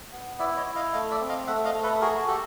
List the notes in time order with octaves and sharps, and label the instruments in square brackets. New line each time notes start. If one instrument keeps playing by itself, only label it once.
[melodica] B3
E4 D5 E5
C#5 D#5
E4
D#5 F5
A3 D#5 F5
D5 E5
C4
D#5 F5
A3 E5 F#5
D#5 F5
A3
A4 B4
F#4 G#4 A#4
F#4 G4 A4